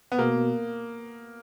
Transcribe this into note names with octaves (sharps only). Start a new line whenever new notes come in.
B3
B2 A#3